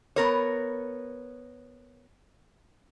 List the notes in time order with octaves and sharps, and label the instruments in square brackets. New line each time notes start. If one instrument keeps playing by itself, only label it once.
[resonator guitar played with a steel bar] B3 A#4 C#5